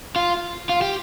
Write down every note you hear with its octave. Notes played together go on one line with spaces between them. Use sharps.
F4
F4
G4